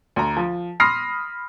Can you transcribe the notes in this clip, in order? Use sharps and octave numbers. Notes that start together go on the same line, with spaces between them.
D2 A#5
F3
B5 C6 D#6 F6 A#6 C7